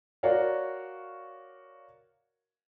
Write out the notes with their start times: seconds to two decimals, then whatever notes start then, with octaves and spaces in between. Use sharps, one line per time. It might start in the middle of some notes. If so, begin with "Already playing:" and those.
0.23 F#4 A#4 C#5 D5 F5